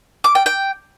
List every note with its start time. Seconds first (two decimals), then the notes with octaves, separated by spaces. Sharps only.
0.24 D6
0.35 G5
0.46 G5